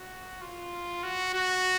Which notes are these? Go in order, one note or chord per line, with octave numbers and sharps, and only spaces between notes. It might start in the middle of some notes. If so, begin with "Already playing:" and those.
Already playing: F#4
F4
F#4
F#4